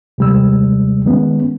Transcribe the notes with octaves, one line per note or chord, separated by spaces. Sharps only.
D#2 C3 G3 G#3 E6
D#3 G#3 B3 C#4